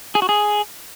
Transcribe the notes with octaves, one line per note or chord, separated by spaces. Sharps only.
G#4
F#4
G#4